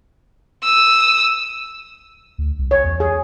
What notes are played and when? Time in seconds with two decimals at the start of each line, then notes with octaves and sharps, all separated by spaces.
0.64 D#6 E6
2.38 D2
2.59 C2
2.71 C#5
2.84 E2
3.00 G#4